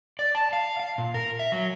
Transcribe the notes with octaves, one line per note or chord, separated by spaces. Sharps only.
D5
A5
F5
F5
A#2
A#4
E5
F#3